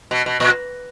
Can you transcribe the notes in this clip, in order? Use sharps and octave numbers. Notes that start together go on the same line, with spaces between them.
B2
B2
A#2